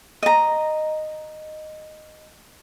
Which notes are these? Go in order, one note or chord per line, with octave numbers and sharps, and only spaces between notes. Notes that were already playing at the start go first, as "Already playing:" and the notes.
D#5 A#5